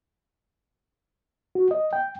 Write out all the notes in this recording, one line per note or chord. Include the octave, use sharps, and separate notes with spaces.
F#4
D#5
G5